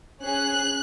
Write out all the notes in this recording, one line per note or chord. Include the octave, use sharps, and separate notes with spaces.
C#4 G#4 F#6